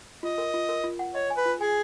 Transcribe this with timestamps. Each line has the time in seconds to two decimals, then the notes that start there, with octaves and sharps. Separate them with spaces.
0.23 F4 D#5
0.38 A#4
0.54 F4
0.69 A#4
0.84 F4
0.99 F#5
1.14 C#5 D#5
1.30 G#5
1.37 B4
1.45 F4
1.61 G#4 G#5